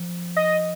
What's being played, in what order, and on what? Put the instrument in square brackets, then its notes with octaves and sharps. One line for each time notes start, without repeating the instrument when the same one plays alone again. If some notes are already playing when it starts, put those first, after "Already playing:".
Already playing: [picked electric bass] F3
[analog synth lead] D#5